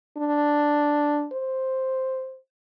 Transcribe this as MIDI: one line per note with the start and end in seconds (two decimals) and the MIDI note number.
0.18 1.27 62
1.33 2.38 72